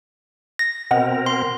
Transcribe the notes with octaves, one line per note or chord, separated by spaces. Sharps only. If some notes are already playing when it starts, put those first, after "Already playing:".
A#6
B2 C4 A#4 D#5 F#5
C6